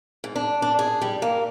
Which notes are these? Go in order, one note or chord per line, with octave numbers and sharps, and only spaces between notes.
G#2
D4
D4
G#4
G3
A#3